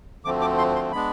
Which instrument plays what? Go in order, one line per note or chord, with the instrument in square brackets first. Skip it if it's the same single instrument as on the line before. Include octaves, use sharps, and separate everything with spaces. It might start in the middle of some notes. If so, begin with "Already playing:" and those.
[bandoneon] D2 D3 F3 A3 C4 D6
D6
C6
C6
G#3 B3 D4 B5